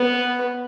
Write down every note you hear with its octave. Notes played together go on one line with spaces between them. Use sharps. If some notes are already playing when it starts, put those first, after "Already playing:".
Already playing: B3